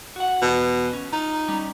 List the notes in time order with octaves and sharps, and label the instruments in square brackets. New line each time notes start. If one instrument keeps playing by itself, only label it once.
[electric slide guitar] F#4 F#5
[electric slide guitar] E2 [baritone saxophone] B2
[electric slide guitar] C#4
[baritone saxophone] D#4 [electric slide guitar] F4
[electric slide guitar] G3 C#4